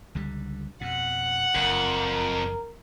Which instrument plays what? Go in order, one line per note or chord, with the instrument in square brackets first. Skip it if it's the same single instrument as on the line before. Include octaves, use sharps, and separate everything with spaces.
[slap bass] C#2 D3 G3
[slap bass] F2 B2 [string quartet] F#5
[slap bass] F#1 [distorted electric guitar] F2 [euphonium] A#4